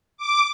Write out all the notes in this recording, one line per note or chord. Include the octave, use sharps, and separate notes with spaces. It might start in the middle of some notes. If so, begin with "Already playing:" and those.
D6